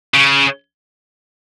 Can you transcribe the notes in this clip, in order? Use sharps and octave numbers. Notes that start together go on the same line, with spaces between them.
C#3